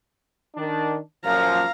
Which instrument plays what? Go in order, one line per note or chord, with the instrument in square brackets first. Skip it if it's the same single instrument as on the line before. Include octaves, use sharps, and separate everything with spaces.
[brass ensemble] D#3 D4
[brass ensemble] F#2 A#2 F3 [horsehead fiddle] F5 A#5